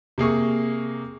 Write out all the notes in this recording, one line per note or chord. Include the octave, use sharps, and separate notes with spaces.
C3 A#3 G#4 C#6